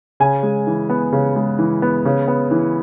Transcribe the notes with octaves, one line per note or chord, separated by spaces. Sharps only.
C#3 G#5
G#3
E3
B3
C#3
G#3
E3
B3
C#3
B3
E3